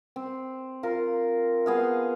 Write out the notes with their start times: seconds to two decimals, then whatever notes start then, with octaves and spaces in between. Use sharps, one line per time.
0.16 C4
0.83 F4 A#4
1.66 B3 G#4 F5